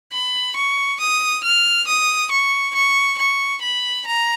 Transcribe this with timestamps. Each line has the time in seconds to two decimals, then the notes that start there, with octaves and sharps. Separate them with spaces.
0.12 B5
0.56 C#6
1.00 D#6
1.43 F6
1.87 D#6
2.31 C#6
2.75 C#6
3.18 C#6
3.62 B5
4.06 A#5